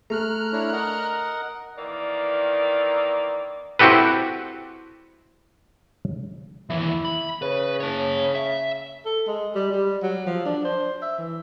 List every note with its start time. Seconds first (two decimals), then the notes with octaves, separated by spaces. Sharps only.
0.10 A3 A#5 F6 F#6
0.53 D4 E4 C#5
0.72 A#4 D#5 F#5
1.77 D#3 E3 A#3 D5
3.79 C4 E4 F#4 G4 A4 B4
6.70 D#2 E3 E4
7.05 B5
7.42 C#3 B4
7.80 C#5 A5
8.35 E5
9.05 A4
9.27 G#3
9.55 G3
9.71 G3
10.02 F#3
10.27 F3
10.45 D4
10.65 C5
11.02 E5
11.18 E3